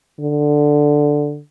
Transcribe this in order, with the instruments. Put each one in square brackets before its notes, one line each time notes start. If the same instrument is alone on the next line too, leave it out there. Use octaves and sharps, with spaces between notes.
[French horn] D3